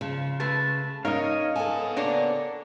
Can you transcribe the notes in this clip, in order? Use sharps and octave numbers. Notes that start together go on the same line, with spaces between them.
C#3 F3
G#3 A3 B4 A5
C#4 D#4 A#4 C#5 D#5 F5
B3 A4 G#5 A5
A#3 D4 C#5